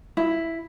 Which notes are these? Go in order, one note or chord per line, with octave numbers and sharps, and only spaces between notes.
E4